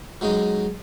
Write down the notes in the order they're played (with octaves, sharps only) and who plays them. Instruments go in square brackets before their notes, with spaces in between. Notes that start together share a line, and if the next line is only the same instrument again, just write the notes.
[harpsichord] F#3 G#3 C#4 D#4